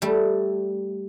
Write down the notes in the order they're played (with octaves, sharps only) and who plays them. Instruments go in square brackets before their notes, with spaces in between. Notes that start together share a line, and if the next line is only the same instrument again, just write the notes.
[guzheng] G3 A3